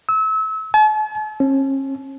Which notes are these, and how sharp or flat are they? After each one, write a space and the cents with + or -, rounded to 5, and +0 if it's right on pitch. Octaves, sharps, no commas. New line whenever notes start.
E6 -30
A5 -45
C#4 -40